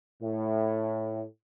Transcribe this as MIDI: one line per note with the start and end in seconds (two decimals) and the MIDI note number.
0.22 1.22 45